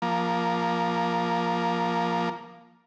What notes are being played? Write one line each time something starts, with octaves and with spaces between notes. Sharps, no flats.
F3 A#3